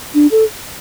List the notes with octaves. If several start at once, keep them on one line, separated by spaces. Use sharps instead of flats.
D4
A4